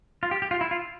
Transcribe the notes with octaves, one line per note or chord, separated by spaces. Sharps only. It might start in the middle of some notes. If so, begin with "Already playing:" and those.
F4
G4
G4
F4
E4
F4